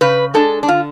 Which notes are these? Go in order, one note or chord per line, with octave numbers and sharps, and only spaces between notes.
C#3 B4
G#3 D4 A4
D4
D3 F4